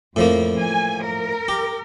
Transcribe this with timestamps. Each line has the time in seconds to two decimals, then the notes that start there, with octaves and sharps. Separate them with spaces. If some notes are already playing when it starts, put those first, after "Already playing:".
0.16 F2 A2 F3 A#3
0.59 G#5
1.04 A#4
1.48 G4